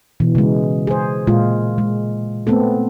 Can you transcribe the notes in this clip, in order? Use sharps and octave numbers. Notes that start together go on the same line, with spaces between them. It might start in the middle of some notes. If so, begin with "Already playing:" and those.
B2 E3
C#3 G#3
G#4 C5
A#2 G#3 F4
G#3
A3 B3 C4 A4